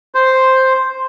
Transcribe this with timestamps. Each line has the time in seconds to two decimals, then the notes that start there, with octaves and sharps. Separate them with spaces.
0.15 C5